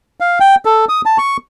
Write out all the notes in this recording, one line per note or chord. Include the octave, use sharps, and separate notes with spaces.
F5
G5
A4
D#6
A5
C#6